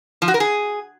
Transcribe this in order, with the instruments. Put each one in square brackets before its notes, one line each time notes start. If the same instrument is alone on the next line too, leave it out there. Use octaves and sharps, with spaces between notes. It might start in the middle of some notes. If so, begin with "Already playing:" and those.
[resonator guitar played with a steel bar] F3
F#4
A#4
G#4